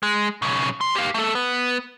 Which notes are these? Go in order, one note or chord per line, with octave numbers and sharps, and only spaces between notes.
G#3
B1 C#3
F3 C6
G4 F5
A3 A4
B3